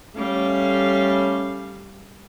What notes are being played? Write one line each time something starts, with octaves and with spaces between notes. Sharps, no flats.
G3 A3 C#4 F5